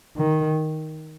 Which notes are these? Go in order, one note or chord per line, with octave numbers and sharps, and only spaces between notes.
D#3